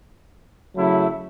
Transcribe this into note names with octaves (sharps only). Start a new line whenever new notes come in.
C#3 F#3 A3 E4